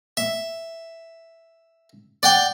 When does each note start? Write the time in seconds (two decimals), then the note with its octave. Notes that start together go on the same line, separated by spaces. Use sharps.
0.17 E5
2.23 D5 F#5 G5